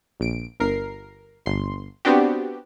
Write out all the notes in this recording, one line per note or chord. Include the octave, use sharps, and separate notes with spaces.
A#1 D7
G1 A#4 C7
G1 C6
B3 C4 D4 F#4 G4